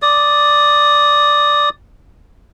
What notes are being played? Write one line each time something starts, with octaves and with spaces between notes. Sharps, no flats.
D5 D#6